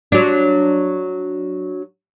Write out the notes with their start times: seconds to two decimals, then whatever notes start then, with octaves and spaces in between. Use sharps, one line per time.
0.12 F#3 D4